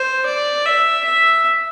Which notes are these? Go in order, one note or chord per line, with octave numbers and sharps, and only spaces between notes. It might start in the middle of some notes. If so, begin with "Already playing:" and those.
Already playing: C5
D5
E5
E5